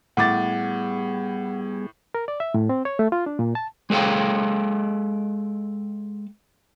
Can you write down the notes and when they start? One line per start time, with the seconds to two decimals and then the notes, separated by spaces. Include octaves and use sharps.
0.17 A2 G3 B3 G#4 F#5 D6 A6
2.15 A#4
2.28 D5
2.40 E5
2.54 A2
2.69 C4
2.85 C#5
2.99 A3
3.12 F4
3.26 D4
3.39 A#2
3.55 A5
3.90 G#3 G#4 A4 F5 G5